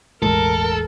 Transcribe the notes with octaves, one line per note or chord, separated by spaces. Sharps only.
E1 A1 G#3 A4 A#4